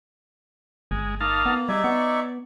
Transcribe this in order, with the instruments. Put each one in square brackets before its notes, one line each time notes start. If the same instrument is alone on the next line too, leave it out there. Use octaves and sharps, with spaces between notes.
[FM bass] G1 [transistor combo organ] G#3
[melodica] A#3 [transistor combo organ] D#4 F5 A5
[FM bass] B3
[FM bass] G3 [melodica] D#4 D5 E5 [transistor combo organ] G#4
[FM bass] B3 [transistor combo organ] C#5